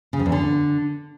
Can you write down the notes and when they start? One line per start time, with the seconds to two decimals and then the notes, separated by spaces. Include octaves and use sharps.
0.13 C#3
0.19 F2
0.26 E2
0.32 D3